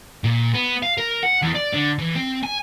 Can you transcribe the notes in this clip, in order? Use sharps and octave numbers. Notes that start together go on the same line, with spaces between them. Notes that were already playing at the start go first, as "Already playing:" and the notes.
A#2
B3
F5
A#4
F#5
E2
D5
D3
E3
C4
G#5